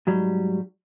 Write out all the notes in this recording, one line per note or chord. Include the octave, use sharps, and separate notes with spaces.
G#2 F#3 G3